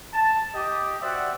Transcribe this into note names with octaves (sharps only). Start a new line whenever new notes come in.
A5
G4 D#5
F#4 C5 D5 E5 F#5 G5